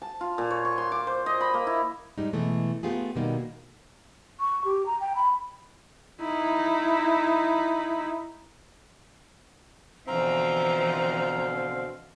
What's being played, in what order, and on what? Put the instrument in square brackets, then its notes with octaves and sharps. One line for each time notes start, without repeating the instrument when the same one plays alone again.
[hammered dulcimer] A5
F4
A#2
C#5
C#6
C6
D6
C5
D#5
B5
A#3
E4
[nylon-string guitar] G#2 G3 G#3 D#4
B2 E3 G#3 A3
A3 B3 F4 G4 G#4
B2 D#3 F#3 G3 A#3 D#4
[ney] C#6
G4
A#5
G5
B5
[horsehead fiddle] D#4 E4
[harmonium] B2 D3 F5 [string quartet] E3 F3 [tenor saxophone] C4 [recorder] A#5